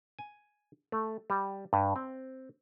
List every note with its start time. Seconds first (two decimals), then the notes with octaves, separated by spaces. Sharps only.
0.19 G#5
0.92 A3
1.30 G3
1.73 G2
1.96 C4